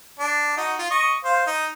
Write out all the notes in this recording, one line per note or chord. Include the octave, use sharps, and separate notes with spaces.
D4
D#4 F#4
F4
D#5 C#6
C5 F5
D#4